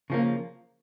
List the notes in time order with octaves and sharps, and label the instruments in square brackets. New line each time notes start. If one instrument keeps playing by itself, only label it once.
[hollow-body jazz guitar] C#3 F3 A#3